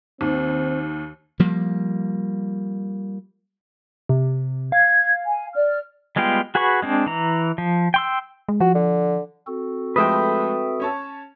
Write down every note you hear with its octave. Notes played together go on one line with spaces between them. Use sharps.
D#2 D#3 C4
F3 G3 A#3
C3
F5 G#6
G#5
D5 F6
G3 G#3 B3 F4 G5
F#4 G#4 B4 B5 C#6
G#3 C4 D4
E3 A#5
F3
G5 C6 E6
G#3
F3 F#4
D3
C4 F#4 A4
F3 G#3 A3 B4 E5 G5 D#6
C#4 C#5 A5